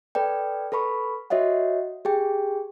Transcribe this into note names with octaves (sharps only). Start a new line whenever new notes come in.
A4 B4 D5 G5
A4 B4 B5 C#6
F#4 C#5 D#5 E5 F#5
G4 G#4 G5